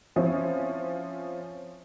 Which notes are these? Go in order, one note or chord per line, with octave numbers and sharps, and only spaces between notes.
F3 C4 C#4 E4